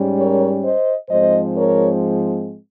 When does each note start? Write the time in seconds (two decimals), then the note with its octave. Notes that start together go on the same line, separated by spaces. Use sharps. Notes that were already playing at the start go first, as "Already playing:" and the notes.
Already playing: G#2 G3 C#4
0.18 A#4 C#5
0.64 C5 D#5
1.09 G#2 F3 G#3 C4 C5 D#5
1.56 A#4 C#5